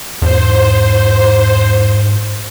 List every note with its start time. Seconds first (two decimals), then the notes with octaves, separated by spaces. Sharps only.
0.22 E2 G#2 C5